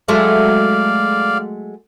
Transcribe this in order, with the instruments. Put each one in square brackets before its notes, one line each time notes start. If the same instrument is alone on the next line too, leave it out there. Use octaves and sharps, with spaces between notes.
[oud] F#3 G#3 A3 [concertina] D5 F5